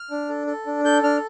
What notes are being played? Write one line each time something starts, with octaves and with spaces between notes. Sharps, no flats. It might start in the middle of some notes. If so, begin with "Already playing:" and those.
Already playing: F6
D4
A4
A4
D4
A4 G6
D4 F6